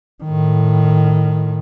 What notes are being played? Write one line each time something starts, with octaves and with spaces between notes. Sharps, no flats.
A2 D#3